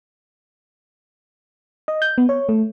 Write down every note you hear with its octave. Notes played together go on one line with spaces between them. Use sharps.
D#5
G6
B3
C#5
A3